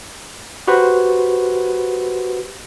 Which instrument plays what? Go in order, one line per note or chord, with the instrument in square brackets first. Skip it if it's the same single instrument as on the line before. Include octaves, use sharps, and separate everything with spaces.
[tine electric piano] F#4 G4 B4 C5